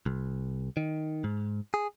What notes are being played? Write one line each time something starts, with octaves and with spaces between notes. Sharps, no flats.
C2
D#3
G#2
G#4